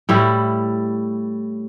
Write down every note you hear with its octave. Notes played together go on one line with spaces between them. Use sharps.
A2 G3 E4